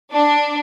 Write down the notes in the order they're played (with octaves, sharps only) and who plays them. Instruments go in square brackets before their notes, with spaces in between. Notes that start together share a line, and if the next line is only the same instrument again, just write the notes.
[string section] D4